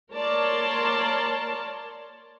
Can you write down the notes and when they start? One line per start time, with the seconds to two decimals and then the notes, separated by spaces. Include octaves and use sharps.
0.13 A#3 A#4 C#5 D5 A5 C6